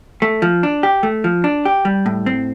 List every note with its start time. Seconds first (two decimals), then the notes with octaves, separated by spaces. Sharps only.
0.22 A3
0.42 F3
0.63 D4
0.83 G4
1.03 A3
1.24 F3
1.44 D4
1.65 G4
1.85 G3
2.06 A2
2.26 C4